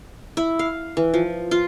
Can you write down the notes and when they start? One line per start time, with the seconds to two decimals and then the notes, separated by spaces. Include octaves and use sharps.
0.37 E4
0.59 F5
0.97 E3
1.14 F3
1.51 F4